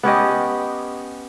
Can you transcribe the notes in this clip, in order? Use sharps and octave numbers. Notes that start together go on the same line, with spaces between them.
B3 C#4 G4 D#5